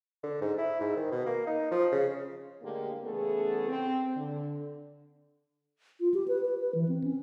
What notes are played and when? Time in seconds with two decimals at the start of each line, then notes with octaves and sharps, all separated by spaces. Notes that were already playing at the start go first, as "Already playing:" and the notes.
0.23 D3
0.41 G#2
0.58 E4
0.81 G#2
0.96 D#3
1.11 B2
1.26 A#3
1.47 D#4
1.71 F3
1.92 C#3
2.63 A2 D3 G#3 A#3 G4
3.04 C#3 E3 A3 B3 G#4 A4
3.68 C4
4.17 D3
6.00 F4
6.14 G4
6.28 B4
6.45 B4
6.60 B4
6.75 E3
6.89 C4
7.04 C#4